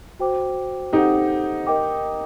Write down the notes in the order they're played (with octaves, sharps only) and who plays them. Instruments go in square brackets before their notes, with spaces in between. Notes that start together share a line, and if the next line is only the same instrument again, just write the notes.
[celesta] F#4 C5 G5 D6
[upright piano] D#4 G4 [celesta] A4 C5 F#5
[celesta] A#4 D#5 G5 D6